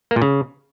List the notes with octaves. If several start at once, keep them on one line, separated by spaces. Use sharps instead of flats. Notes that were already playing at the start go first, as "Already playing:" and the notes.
A#3
A#2
C#3